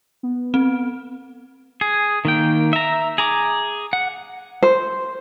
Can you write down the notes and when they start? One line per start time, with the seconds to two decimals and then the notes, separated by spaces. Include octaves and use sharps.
0.23 B3
0.54 C4
1.81 G#4
2.25 D#3 A#3 G5
2.73 E5 A#5
3.18 G#4 A#5 D6
3.93 F#5
4.63 C5